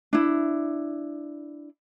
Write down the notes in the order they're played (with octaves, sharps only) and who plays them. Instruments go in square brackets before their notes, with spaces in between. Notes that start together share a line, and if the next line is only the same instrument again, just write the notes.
[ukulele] D4 E4